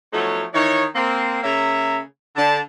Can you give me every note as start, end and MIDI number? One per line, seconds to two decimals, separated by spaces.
0.13 0.44 53
0.13 0.44 54
0.13 0.44 57
0.13 0.44 59
0.13 0.44 63
0.13 0.44 73
0.54 0.85 51
0.54 0.85 52
0.54 0.85 63
0.54 0.85 73
0.95 1.39 58
0.95 1.39 60
1.43 1.99 49
1.43 1.99 58
1.43 1.99 61
1.43 1.99 76
1.43 1.99 82
2.36 2.58 50
2.36 2.58 81